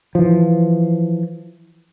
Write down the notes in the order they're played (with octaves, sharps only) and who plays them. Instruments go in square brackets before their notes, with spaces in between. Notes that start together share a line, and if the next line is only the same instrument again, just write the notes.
[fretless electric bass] E3 F3